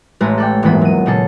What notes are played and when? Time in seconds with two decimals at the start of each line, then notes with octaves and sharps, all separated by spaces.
0.20 A1 G#3 A3 B4 A#5
0.38 A4 D5 G5
0.63 D#1 G#2 E3 A#3 B3 B5
0.81 F#3 D#7
1.06 A#2 C#3 D#4 G#4 A4